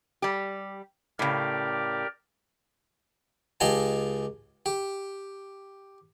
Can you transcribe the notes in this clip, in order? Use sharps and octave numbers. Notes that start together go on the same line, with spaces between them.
G3 G4
A2 C#3 G4 A#4 D5
C#2 G4 D#5 F5 G#5 A5
G4